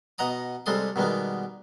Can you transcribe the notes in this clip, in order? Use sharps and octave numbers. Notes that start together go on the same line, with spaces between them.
B2 D#5 F#5 A#5 D#6
C3 G3 G#3 A4 C6 D#6
B2 D#3 G3 G#3 B3